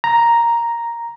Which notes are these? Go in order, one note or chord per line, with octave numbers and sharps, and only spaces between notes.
A#5